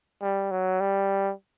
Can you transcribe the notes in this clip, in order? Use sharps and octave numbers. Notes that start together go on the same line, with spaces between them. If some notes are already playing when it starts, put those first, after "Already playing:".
G3
F#3
G3